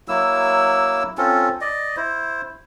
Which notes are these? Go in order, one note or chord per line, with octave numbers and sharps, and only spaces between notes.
F#3 A#3 E4 E6
C4 C#4 F4 A4
D5 D#5
E4 C5